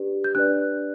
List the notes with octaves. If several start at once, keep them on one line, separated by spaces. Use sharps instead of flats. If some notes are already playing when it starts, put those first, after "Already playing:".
Already playing: D4 G4 B4 D5
G6
D4 G4 B4 D5 F#6